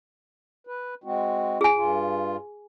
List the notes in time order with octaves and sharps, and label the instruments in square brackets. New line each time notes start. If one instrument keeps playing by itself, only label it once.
[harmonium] B4
G#3 C4 F#4
[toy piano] G#4 G#5
[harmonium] G2 F4